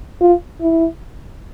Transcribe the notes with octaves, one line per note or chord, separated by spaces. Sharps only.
F4
E4